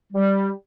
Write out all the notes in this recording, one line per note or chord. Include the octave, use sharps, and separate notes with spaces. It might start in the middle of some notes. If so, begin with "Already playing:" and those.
G3